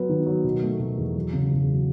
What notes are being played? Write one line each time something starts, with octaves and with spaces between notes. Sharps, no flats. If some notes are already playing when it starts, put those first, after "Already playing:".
Already playing: F#3 B3
D#3
F#3
B2
A3
B2
E2
F#3
C#3
E2
F#3